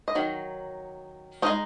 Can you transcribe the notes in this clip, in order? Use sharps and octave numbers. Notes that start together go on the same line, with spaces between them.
D#5
D#3 F#3
G#3 D#4 D#5